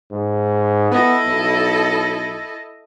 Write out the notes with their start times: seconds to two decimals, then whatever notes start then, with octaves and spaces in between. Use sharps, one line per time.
0.11 G#2
0.91 B3 E4 A4 D#5
1.26 B1